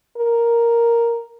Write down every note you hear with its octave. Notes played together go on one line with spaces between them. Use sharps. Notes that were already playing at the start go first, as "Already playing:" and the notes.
A#4